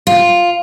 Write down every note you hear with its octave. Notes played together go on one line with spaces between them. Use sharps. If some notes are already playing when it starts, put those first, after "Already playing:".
F4